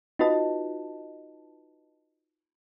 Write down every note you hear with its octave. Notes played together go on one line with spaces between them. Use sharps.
D#4 F4 F#4 B4 D#5 A5